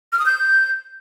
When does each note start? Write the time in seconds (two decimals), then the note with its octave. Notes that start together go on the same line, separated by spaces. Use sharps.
0.12 F6
0.19 D#6
0.26 G6